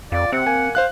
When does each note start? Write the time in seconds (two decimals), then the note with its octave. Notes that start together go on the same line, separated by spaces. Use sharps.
0.12 F2 F4 D5
0.32 C3 C4 F#5
0.47 A#3 G#5
0.75 C5 F5 F#6